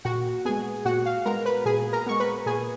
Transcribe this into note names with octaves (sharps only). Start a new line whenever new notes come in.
A#2 F#4 F#5
G#3 B3 G#4 G#5
A#2 F#4 F#5
F5
G#3 B3 A#4 A#5
B4 B5
A#2 G#4 G#5
A#4 A#5
G#3 B3 C#6
B4 B5
A#2 G#4 G#5